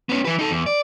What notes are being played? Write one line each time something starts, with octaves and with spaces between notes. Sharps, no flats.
B3 C#4
E3 B4
D#4 A4
E2
D5